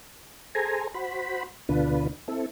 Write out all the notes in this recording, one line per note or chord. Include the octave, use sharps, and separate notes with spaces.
G#4 A4 C5 G#5 A#5
F#4 C5 B5
D2 B2 D3 D4 F4 B4
C4 E4 A4